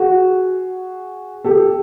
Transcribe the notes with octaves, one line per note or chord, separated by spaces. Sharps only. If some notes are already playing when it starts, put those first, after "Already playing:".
Already playing: F#4 G#4
G4 A4